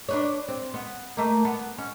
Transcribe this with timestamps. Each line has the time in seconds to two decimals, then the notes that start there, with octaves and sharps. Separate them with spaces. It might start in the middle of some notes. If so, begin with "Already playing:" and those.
0.09 D4 B4 C#5
0.48 C4
0.74 B3
1.17 A3 A#3
1.45 B3
1.78 C#4